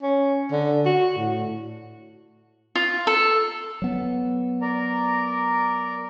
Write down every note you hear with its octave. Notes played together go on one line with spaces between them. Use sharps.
C#4
D3
F#4
A2
F4
A4
F#3 B3
A#4 D5 A#5